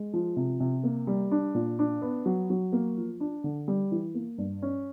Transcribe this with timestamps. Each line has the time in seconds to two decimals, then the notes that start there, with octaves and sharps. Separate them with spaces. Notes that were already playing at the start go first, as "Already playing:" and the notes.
Already playing: G#3
0.13 F3
0.36 C3
0.60 C3
0.84 A#3
1.07 G3
1.31 D4
1.55 A#2
1.79 D4
2.02 B3
2.26 F#3
2.50 F#3
2.73 A#3
2.97 F3
3.20 D4
3.44 D3
3.68 G3
3.92 E3
4.15 A#3
4.38 G2
4.62 C#4